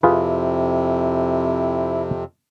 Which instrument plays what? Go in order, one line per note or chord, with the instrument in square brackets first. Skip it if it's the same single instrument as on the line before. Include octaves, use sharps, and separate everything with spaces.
[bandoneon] F2 C3 [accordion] E4 [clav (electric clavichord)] F4 G#4 B4